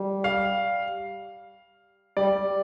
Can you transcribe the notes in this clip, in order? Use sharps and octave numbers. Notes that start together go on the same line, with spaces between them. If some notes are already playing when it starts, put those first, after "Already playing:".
Already playing: G3
F5
G3 D5